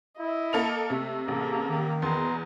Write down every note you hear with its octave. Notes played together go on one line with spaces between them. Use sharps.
E4 D#5
A#3 A4 F7
C3 A3 E5
A1 C3 A#3 G#4 A4
D#3
E2 B2 B3 A#5 C6